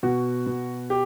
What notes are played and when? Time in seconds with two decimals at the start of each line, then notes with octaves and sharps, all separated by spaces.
0.03 B2 F#4
0.46 B2
0.90 G4